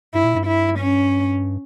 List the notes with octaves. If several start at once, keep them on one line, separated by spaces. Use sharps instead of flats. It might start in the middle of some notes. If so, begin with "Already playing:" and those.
G2 E4
A#2
G2
E4
C#4